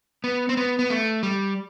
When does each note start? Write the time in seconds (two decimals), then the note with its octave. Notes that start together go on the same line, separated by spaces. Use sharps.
0.24 B3
0.49 C4
0.57 B3
0.79 B3
0.90 A3
1.23 G3